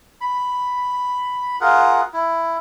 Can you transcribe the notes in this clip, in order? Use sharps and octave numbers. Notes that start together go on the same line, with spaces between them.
B5
F4 G#4 A#4 F#5
E4